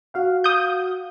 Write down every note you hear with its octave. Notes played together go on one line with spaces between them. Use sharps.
F#4 F5 F#5
D#6 G6